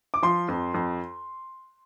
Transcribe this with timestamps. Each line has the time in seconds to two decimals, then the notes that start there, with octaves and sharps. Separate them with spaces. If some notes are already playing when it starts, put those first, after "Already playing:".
0.14 D6
0.23 F3 C6
0.48 F2
0.74 F2